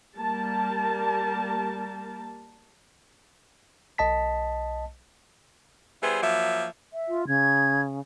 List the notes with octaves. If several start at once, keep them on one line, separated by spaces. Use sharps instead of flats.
G3 A#3 A#4 A5
B1 D#5 A5 B6
G3 B3 E4 G#4 C5
F3 F#3 A#3 E5
E5
F4
C#3 G#6